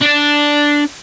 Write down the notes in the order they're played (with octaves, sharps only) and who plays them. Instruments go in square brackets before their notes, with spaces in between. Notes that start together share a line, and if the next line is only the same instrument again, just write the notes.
[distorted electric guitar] D4 D5